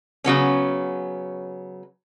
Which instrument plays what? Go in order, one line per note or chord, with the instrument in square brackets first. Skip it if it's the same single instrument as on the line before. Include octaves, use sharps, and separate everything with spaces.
[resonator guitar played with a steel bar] C#3 F#3 B3 C#4